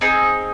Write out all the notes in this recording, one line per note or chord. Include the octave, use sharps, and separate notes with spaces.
C4 D#4 G#4